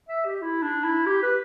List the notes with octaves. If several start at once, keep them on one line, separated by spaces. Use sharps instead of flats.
E5
G4
E4
D4
E4
G4
B4